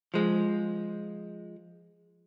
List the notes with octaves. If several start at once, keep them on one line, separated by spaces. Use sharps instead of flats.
F3 G#3